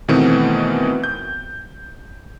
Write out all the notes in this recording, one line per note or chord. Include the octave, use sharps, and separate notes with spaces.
B2 D#3 E3 A3 B3 C4
G6